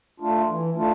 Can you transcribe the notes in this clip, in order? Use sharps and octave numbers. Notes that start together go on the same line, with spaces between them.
A3 D4 F4
E3
A3 D4 F4